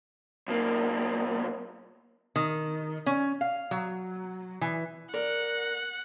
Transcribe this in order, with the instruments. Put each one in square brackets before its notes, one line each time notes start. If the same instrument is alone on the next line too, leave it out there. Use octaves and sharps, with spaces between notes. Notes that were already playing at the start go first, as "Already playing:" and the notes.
[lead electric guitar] B1 A#3
[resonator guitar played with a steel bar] D#3
C#4
F5
F#3
E3
[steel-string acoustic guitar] A#4 D5 [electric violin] F#5